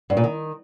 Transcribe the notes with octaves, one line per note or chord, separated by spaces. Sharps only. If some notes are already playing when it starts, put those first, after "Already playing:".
G2
A#2
D#3